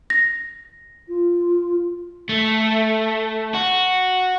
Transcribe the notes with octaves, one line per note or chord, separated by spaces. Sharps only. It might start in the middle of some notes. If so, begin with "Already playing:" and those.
A#6
F4
A3
F#4